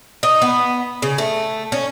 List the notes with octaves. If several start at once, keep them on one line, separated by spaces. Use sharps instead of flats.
D#4
B3
C#3
A3
C#4